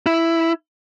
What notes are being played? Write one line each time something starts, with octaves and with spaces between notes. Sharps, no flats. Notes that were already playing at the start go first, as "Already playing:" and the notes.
E4